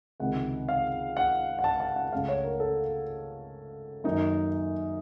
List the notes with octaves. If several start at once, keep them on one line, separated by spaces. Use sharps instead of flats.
C#2 C3 D#3 F#5
F5
F#5
F#5
A5
A5
F#5
C#2 C#3 A3 F5
C#5
A#4
A4
F#2 D#3 A#3 D#4